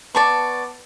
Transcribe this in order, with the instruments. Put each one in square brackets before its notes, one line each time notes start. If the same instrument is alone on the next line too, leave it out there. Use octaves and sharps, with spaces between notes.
[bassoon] B3 [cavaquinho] D5 A5 C#6